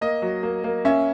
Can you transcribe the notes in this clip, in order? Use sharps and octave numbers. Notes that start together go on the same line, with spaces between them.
A#3 D#5
F#3
A#3
A#3
C#4 E5